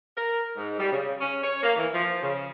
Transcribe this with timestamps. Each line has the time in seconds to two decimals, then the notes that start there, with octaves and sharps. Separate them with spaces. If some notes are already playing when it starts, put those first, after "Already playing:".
0.15 A#4
0.56 G#2
0.78 G3
0.91 C#3
1.20 C#4
1.42 C#5
1.63 A#3
1.76 E3
1.93 F3
2.22 C#3